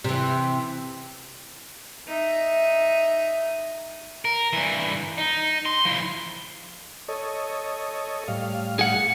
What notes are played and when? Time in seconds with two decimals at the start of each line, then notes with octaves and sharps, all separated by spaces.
0.04 C3 E3
2.08 D#4 E5
4.25 A#4
4.53 G2 E3
5.18 D#4
5.66 C6
5.85 F3 E4
7.08 A4 C#5 D#5
8.28 A2 G3 F5
8.79 G#4 F#5